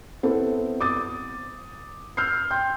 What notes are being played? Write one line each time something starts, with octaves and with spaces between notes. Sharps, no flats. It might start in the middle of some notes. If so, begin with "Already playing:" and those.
B3 C4 E4 A4
D6 D#6 A6
E6 F6 G6 C7
G5 C6 G6